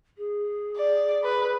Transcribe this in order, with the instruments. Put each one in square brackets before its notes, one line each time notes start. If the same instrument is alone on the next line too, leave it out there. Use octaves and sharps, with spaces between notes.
[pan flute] G#4
[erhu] D5
B4